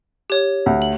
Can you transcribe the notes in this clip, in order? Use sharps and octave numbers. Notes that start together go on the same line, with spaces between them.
G4 C#5
D2
F#7